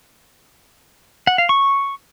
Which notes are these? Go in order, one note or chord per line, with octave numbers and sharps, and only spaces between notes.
F#5
F5
C#6